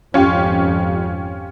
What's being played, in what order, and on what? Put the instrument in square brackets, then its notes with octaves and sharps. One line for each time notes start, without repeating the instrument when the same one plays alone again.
[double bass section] G#1 F2 [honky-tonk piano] C#4 F4 G4